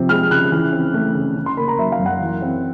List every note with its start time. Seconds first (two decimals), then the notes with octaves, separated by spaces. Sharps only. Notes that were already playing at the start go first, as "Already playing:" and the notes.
Already playing: C3 F3 C4
0.09 G#3 F6
0.31 C#3 F#6
0.52 E3
0.73 C4
0.94 A3
1.15 C#3
1.36 C#3
1.46 C6
1.57 A#3 B5
1.68 A#5
1.79 F#3 E5
1.92 F5
1.99 F#2
2.06 F#5
2.21 E3
2.42 C4